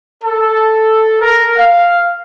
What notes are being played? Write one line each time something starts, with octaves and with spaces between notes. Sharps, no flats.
A4
A#4
F5